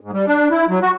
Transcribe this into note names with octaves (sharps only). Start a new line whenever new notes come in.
G#2
G3
D4
E4
F#3
F#4